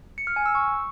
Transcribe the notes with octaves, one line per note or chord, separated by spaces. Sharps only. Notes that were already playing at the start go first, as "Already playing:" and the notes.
C#7
F6
G#5
E6
C#6